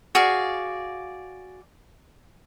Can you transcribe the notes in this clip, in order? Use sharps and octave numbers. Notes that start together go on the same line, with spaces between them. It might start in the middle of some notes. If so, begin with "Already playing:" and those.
F#4 G#4 D5 F5